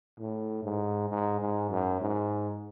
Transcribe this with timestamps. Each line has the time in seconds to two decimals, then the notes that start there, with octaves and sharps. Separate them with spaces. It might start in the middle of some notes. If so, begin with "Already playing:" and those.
0.19 A2
0.63 G#2
1.09 G#2
1.41 G#2
1.70 F#2
2.01 G#2